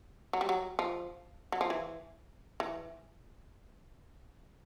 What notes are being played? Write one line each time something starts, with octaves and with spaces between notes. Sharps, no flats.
F#3
G3
F#3
F3
F#3
F3
E3
E3